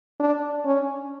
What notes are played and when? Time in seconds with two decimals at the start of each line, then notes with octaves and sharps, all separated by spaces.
0.20 D4
0.65 C#4